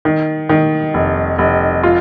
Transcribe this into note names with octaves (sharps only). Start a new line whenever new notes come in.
D#3
D#3
F1
F1
F4